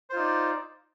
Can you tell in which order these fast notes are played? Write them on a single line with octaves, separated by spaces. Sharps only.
C5 F4 D#4 D5